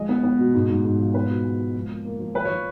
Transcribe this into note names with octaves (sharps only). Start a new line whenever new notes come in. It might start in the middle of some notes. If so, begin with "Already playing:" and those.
Already playing: F3 G#3 D#5
B3
B3
B2
G#2
G#2
G#2
F3
B3 B4
B2
G#3
G#3
F3
A#3
A#3
F3
F3 B4
F3 C#5